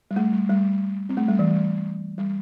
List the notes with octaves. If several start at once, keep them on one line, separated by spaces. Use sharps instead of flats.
G3
A3
G3
G3
C4
A3
G3
E3
G3
G3